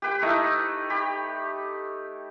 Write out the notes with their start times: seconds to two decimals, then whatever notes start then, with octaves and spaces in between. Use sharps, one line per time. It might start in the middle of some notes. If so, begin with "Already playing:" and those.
0.02 G4 B4 G5
0.22 A3 D#4 E4
0.90 G4 B5